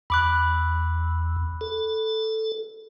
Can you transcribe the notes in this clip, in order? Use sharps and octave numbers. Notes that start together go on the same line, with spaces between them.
E2 B5 D6 F#6
A4